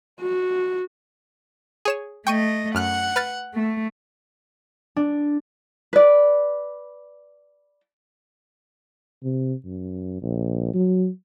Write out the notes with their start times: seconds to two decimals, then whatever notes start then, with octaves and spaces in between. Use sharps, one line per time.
0.21 F#4
1.85 G#4 C#5 E7
2.27 A3 D#5 G5 C#6 D#7
2.75 F#2 F#5 F6 F#6
3.16 B4 F6 A6
3.54 A3
4.96 D4
5.93 B4 D5
9.23 C3
9.65 F#2
10.22 A#1
10.74 F#3